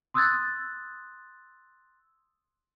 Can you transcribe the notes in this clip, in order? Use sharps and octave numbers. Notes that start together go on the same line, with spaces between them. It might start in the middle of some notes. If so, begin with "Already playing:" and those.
C6 D#6 E6 F#6 G#6 A6